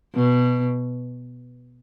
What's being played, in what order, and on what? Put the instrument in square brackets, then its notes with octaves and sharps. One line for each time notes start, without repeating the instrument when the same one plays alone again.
[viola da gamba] B2